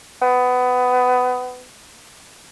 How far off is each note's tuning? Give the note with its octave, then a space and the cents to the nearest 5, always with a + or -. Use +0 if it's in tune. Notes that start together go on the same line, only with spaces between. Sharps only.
B3 +20